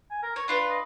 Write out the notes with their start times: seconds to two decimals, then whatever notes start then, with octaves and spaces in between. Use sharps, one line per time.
0.11 G#5
0.23 A#4
0.36 C#5 C#6
0.48 D4 F4 B4 B5
0.70 D#5